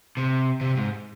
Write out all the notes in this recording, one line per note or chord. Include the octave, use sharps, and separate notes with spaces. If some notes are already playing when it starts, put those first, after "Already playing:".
C3
C3
G#2